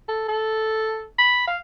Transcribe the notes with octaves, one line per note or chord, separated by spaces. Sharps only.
A4
A4
B5
F5